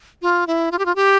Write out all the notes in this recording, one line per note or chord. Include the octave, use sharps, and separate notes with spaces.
F4
E4
F4
G4
F4
G4